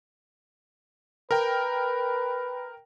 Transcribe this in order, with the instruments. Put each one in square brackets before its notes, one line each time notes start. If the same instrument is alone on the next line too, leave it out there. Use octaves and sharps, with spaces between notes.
[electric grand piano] A#4 G5 [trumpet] B4